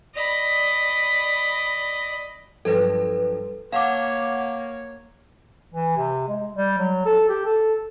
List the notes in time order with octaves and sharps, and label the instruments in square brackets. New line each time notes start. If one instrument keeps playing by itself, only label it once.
[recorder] D5 [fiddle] D#5 B5
[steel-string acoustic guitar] G2 F3 F#3 [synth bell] A4 B4
[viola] A#3 C#5 [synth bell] F5 F#5 D6 [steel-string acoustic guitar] A5
[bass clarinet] E3
C3
G#3
G3
F#3
A4
G4
A4